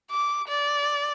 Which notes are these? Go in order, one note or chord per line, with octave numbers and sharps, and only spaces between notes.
D6
D5